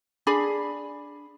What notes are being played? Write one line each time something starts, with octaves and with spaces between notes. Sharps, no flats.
D4 G#4 B5